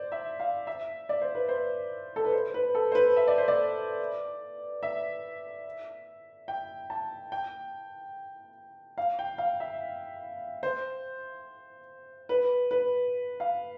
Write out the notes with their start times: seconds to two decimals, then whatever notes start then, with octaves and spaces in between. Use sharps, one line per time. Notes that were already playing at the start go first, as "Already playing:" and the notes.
Already playing: C5 D5
0.12 E5
0.40 F5
0.67 E5
1.09 D5
1.21 C5
1.35 B4
1.49 C5
2.16 A4
2.25 B4
2.33 C5
2.54 B4
2.75 A4
2.92 C5
2.95 B4
3.17 E5
3.28 D5
3.38 C5
3.48 D5
4.83 E5
6.48 G5
6.90 A5
7.32 G5
8.98 F5
9.19 G5
9.38 F5
9.60 E5
10.63 C5
12.29 B4
12.71 B4
13.40 F5